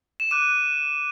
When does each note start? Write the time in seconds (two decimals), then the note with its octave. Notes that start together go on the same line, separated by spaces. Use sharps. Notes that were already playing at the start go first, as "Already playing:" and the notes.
0.20 E7
0.31 D6 F#6 D#7